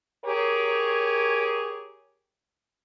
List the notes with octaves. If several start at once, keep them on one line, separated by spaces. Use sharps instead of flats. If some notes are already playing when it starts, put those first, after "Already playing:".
G4 G#4 A#4 C#5